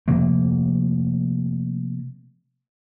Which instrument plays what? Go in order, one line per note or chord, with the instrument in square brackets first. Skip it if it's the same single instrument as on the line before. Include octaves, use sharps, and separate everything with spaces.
[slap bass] C3 F3 A3 A#3